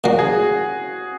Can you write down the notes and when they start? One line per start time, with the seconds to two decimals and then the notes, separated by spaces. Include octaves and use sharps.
0.04 A#2 F#3 A#3 F#4
0.19 G#4